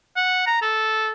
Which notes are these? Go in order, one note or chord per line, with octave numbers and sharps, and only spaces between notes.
F#5
A#5
A4